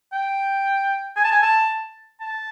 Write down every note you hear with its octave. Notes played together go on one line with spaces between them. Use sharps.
G5
G#5
A5
G#5
A5
A5